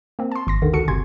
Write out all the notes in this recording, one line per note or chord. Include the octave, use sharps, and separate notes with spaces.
A#3 C4
A5 C6
G#1 C6 A#6
D#2 D3 D#3
C#2 F#4 A4 C#7
G1 C3 G#5 C6 G#6